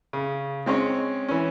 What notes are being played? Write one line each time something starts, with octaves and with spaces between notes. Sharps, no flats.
C#3
G#3 C4 C#4 C#5
E3 C#4